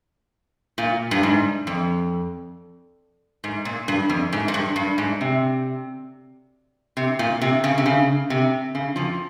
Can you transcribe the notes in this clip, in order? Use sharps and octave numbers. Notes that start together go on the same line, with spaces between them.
A#2
G2
G#2
F2
G#2
A#2
G2
F2
G#2
G#2
G2
G2
G#2
C3
C3
A#2
C3
C#3
C3
C#3
C3
C#3
F2 F3